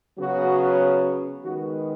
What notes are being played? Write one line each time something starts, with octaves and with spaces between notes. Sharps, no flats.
C#3 F#3 B3 F#4
D#3 G#3 B3 F#4